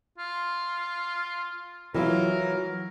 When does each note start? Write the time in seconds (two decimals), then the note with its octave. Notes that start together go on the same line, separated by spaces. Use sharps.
0.19 F4
1.94 E3 F#3 F4 A#4